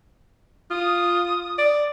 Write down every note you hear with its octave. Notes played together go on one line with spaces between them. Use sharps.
F4 D#6
D5